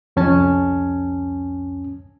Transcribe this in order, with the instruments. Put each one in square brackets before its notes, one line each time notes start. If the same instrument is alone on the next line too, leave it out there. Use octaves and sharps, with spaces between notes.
[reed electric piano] C2 F2 C#4 G#5 A5